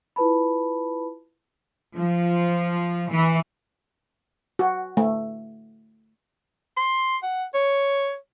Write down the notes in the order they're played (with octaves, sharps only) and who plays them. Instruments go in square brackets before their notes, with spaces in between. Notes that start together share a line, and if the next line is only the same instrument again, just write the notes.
[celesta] E4 F4 B4 A5 B5
[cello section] F3
E3
[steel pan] F#4
A3
[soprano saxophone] C6
F#5
C#5